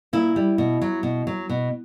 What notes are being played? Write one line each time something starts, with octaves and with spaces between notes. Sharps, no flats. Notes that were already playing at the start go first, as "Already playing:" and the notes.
A#2 E4
G3
B2
F#3
B2
F#3
B2